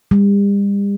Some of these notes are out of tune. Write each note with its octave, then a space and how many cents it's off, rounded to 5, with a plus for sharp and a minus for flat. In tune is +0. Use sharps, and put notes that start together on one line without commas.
G3 +40